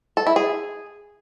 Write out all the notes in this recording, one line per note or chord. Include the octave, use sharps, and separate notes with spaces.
A4
E4
G#4